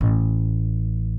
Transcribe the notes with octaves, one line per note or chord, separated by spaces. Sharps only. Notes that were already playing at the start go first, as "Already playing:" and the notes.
A1